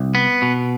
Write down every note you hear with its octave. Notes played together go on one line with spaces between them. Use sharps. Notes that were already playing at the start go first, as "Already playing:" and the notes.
Already playing: C2
B3
B2